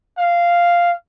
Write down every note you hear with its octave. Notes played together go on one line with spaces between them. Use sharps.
F5